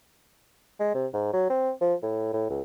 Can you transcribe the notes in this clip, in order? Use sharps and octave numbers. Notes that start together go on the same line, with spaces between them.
G#3
C3
G#2
F#3
C4
F3
A2
A2
C#2